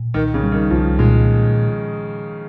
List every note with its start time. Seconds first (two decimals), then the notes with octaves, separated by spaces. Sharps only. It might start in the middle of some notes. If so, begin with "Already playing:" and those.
Already playing: A#2
0.14 C2 D#3
0.34 C#3
0.43 G3
0.52 D#3
0.70 C2 F3
0.99 A#2 G#3